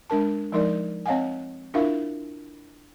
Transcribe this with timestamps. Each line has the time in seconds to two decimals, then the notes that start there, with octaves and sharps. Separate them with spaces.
0.10 G#3 D4 A#4 A5
0.52 F3 G#3 D#4 A#4 D5
1.06 C4 C#5 D#5 F5 F#5 G#5
1.74 D4 E4 F4 A#4 E5 F5